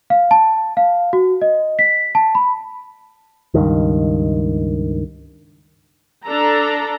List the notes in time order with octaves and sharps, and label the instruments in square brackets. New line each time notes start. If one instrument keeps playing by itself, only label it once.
[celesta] F5
A5
F5
F#4
D#5
B6
A5
B5
[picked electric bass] C#2 G2 D#3
[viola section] D4 A4 A#5